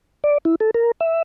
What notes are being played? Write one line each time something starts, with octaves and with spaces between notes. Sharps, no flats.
D5
E4
A4
A#4
E5